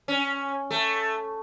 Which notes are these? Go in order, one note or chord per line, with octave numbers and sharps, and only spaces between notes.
C#4
A3